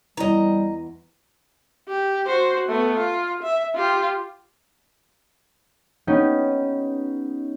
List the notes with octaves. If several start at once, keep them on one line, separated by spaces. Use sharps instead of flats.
E2 E3 G3 D#5 A#5
G4
F#4 C5
A3 B3
F4
E5
F4 G4
B3 C#4 D#4 G4